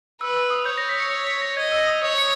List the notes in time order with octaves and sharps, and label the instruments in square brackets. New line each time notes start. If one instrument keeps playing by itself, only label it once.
[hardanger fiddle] B4 [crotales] E6
[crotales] E6
D#6
[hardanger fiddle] C#5 [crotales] G6
[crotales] A#6
B6
C#7
B6
A#6
[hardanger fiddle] D#5 [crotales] G#6
[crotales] E6
D#6
[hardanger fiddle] C#5 [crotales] D#6
[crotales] C#7